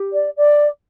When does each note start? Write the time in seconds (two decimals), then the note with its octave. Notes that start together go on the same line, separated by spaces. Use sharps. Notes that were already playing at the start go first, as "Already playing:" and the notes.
Already playing: G4
0.13 D5
0.37 D5